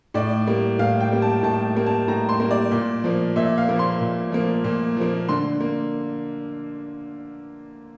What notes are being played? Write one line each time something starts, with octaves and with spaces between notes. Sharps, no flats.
A2 D5
G3 A#3
A2 F5
G5
G3 A#3
A5
A2 A5
G3 A#3
A5
A2 A#5
C6
G3 A#3
D5
A#2
F3 A#3
A#2 E5
F5
F3 A#3
C6
A#2
F3 A#3
A#2
F3 A#3
D3 C6
A#3